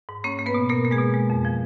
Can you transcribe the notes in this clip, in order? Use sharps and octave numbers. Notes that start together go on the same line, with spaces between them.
G#2
A#3 C#4 C#5
A#3
B3 B4
B2
B2 A#3 A#4
A#3
G#3 G#4
B2
G#3
F2
F3